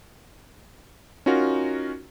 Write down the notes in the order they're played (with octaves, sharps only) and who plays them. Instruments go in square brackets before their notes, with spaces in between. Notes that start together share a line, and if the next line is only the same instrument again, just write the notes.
[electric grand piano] C#4 D#4 F4 F#4 A#4